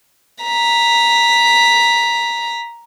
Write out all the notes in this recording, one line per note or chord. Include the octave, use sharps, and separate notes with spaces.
A#5 B6